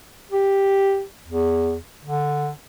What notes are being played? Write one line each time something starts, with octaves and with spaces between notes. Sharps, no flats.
G4
E2
D3